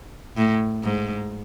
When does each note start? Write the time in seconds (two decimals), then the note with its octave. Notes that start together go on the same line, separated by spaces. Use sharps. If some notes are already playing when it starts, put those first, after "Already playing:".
0.37 A2
0.83 G#2